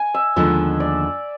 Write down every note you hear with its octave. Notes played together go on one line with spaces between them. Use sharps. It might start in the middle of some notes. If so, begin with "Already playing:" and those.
Already playing: G#5
E5
D#2 D3 F3 G#3 B3 E5
D5